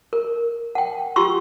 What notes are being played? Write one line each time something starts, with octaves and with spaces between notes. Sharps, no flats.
A#4
F#5 G5
F4 G4 C6 C#6 E6